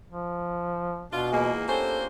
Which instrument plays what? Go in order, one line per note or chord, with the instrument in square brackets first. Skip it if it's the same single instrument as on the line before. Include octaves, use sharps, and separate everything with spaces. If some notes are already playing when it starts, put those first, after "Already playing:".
[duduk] F3
[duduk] B2 [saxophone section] D4 F4
[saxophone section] E2 A#3 [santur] G#3 B3 F4
[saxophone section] A#3 D4 C5 [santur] C#4 G4 [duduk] A4